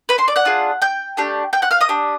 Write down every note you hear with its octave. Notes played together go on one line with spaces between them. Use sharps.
B4 B5
C5 C6
D5 D6
F#5 F#6
D4 F4 G#4
G5 G6
A3 D4 G4
G5 G6
F#5 F#6
F5 F6
D#5 D#6
D4 G4